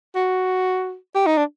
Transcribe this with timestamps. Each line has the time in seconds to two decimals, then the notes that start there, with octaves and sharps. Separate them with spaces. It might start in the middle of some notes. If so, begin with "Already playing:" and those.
0.15 F#4
1.15 G4
1.26 D#4
1.37 D4